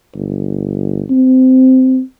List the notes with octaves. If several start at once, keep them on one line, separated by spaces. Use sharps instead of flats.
G1
C4